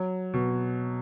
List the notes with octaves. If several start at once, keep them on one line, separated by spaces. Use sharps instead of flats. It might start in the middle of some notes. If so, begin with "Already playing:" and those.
Already playing: F#3
B2